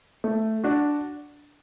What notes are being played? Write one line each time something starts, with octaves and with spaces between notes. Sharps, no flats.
A3
D4 F#4